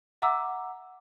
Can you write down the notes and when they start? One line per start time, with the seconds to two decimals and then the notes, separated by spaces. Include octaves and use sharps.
0.22 E5 F#5 A#5 D6 E6